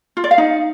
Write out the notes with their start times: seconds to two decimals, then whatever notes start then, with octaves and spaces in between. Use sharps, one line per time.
0.17 F4
0.24 D5
0.31 F5
0.38 D#4